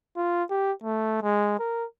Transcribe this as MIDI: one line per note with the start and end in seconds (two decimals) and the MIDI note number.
0.17 0.43 65
0.50 0.72 67
0.83 1.22 57
1.22 1.56 56
1.59 1.85 70